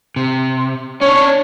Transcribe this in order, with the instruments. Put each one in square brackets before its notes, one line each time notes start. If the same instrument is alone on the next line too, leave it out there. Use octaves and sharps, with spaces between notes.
[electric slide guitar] C3
[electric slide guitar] C#4 D4 [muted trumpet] C#5